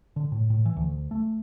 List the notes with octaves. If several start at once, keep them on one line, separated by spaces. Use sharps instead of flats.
D3
A2
A2
E3
D2
A3